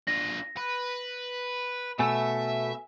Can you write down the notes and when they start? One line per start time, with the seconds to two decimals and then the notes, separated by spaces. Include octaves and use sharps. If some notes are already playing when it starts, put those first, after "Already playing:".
0.07 D4 F4 A#6
0.57 B4
1.99 B2 A3 E5 G#5